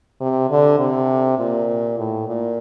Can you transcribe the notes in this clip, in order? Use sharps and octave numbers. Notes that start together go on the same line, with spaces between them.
C3
D3
C3
A#2
A2
A#2